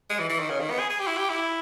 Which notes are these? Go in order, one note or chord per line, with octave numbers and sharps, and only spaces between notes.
G#3
E3
E3
D#3
C#3
D#3
B3
G#4
G#4
G4
E4
G4
E4